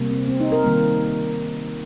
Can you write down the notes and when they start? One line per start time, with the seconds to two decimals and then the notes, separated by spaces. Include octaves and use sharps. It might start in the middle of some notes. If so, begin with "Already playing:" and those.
Already playing: C3 G3 A#3
0.11 C4
0.28 C4
0.40 D#4
0.52 A#4
0.64 D#3 G3 A#3